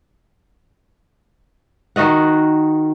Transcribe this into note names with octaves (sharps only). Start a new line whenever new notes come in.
D#3 F#4 D#5 F#5